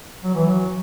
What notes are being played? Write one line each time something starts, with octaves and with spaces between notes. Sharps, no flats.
F#3
E3
F#3